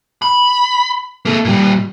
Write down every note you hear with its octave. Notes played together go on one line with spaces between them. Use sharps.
B5
A#3 A4
A#2 G3